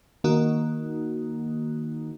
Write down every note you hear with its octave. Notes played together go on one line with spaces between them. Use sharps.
D#3 A#3 D#4 F#4